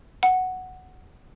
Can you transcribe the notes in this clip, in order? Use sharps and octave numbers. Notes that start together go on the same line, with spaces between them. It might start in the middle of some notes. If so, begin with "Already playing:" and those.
F#5